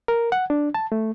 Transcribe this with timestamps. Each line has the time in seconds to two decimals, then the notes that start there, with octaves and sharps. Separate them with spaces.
0.08 A#4
0.32 F#5
0.50 D4
0.74 A5
0.92 A3